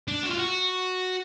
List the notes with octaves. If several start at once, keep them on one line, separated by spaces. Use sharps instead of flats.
D4
F#4
F4
F#4